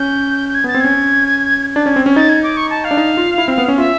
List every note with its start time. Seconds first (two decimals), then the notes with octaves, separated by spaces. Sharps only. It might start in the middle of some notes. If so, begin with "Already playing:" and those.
Already playing: C#4 G6
0.49 G6
0.55 G#6
0.64 B3 A6
0.75 C4
0.81 C#4 G#6
1.76 D4 A6
1.86 C#4 G#6
1.96 C4
2.06 C#4
2.16 D#4 A6
2.29 G#6
2.43 D6
2.57 C#6
2.70 A5
2.84 F5
2.91 D4
2.97 D#4
3.17 F4
3.38 E4
3.48 C4
3.58 B3
3.68 C#4
3.78 F4 E5